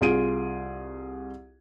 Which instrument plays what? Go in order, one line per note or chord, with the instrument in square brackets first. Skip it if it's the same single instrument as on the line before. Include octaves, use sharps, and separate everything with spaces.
[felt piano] C2 F4 G#4 D7 D#7